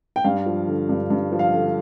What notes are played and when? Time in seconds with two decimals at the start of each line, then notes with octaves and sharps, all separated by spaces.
0.16 G5
0.24 G2 F5
0.46 F3
0.67 D3
0.89 G2
1.10 G2
1.32 F3
1.39 F5
1.53 D3